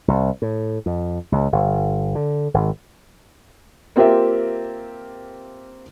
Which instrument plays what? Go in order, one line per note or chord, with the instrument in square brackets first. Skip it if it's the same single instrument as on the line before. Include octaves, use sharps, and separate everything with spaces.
[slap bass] C2
A2
F2
C#2
G1
D3
G#1
[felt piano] A#3 C4 F4 G4 A#4 E5